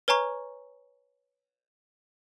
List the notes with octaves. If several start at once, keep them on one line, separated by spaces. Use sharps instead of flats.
B4 C#5 G#5 A#5 C#6